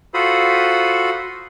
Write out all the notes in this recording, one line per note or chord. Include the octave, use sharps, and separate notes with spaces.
F4 F#4 A4 C5 B5 D#6